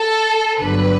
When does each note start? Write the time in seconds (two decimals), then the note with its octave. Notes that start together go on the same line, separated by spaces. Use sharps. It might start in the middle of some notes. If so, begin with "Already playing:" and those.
Already playing: A4
0.60 G1 G2 D3 F#3 B4